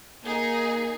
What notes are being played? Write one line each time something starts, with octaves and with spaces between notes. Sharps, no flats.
A#3 D#4 G#4